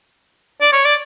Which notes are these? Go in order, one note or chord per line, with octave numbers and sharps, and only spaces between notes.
D5
C#5
D5